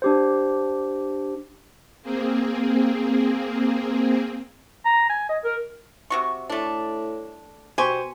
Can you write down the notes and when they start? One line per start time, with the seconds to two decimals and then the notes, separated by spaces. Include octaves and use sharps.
0.02 D4 G4 C5
2.02 A#3 C4 G#4
4.85 A#5
5.10 G#5
5.29 D#5
5.44 A#4
6.10 C3 F#4 C#6
6.50 A2 A3 D4
7.78 B2 G4 C5 G#5 C#6